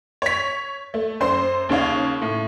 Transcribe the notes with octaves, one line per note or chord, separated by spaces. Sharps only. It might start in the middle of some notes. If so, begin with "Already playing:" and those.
C#5 B6
A3
F#2 C5 C6
D#2 C#3 C#5 F5
A2